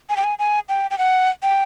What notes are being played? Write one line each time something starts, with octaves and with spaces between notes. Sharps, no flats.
G#5
G5
G#5
G#5
G5
G5
F#5
G5